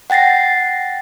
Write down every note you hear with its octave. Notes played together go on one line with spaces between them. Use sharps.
F#5 G5 A6 A#6 C7